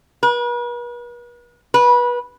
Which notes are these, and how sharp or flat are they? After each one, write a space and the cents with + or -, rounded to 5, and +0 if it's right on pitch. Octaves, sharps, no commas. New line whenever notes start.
B4 -45
B4 -25